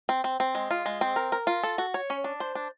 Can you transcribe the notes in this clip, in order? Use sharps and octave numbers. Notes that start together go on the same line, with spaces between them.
C4
C4
C4
G#3
F4
G#3
C4
A#4
A#4
F4
A4
F#4
C#5
C#4
D4
C5
D4